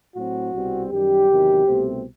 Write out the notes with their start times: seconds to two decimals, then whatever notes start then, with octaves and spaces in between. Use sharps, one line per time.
0.15 A2 F#3 C4 F#4
0.53 C2 B2 G3 C4
0.91 F#2 D#3 G3 G4
1.29 E2 C3 D#3 F#3
1.66 C2 B2 A3 C4